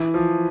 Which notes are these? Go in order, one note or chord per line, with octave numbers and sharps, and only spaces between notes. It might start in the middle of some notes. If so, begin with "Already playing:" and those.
Already playing: E3
F3